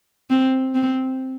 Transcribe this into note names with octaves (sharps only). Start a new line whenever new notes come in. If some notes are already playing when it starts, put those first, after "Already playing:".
C4
C4